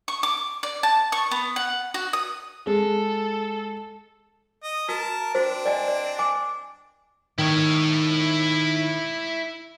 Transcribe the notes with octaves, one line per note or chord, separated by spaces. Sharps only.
C#6
D6
D5
A5
C#6
B3
F#5
F#4
D#6
G#3 A4
D#5
F#4 A#4 A5
C4 D4 F#4 C5
D5 D#5 G#5
D5
G#5 D6
D#3 E4 C#5